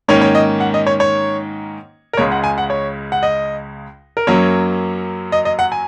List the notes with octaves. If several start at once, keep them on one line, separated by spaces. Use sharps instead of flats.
G#2 D#3 A#3 C#4 C#5
C#5
D#5
F#5
D#5
C#5
C#5
A#4
C#2 C#3 G#3 C#5
F#5
G#5
F#5
C#5
F#5
D#5
A#4
F#2 F#3 A#3 C#4 C#5
D#5
D#5
F#5
G#5